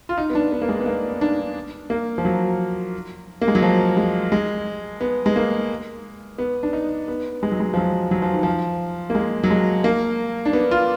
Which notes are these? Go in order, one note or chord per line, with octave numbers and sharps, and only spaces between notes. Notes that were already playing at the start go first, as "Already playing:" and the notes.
F4
D#4
B3
D4
B3
A#3
G#3
B3
A#3
B3
D4
A#3
F3
F#3
A#3
G#3
F#3
F3
G#3
G#3
B3
G#3
A#3
B3
D4
D#4
B3
G#3
F#3
G#3
F3
F#3
F#3
F3
D#3
F3
A#3
G#3
F#3
G#3
A#3
D4
B3
F4